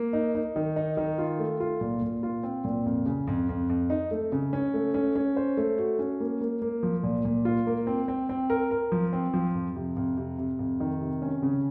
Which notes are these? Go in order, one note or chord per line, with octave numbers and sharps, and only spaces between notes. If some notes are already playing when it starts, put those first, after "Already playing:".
Already playing: A#3
D#4
D#4
D#3
D#4
D#3
F4
A3
F4
A#2
A#2
F4
C4
A#2
F2
C#3
F2
F2
F2
D#4
A3
C#3
C#4
A3
C#4
C#4
C5
A3
F#4
C#4
A#3
A#3
A#3
F3
A#2
A#2
F4
A#3
C4
C4
C4
A#4
A#4
F3
C4
F3
F2
C3
F2
C3
C3
F2
D#3
C3
C#4
C#3